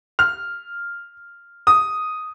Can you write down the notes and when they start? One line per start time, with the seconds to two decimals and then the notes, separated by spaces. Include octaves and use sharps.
0.19 F6
1.67 D#6